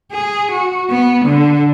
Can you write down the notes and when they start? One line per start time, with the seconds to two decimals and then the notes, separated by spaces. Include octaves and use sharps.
0.12 G#4
0.52 F#4
0.90 B3
1.25 D3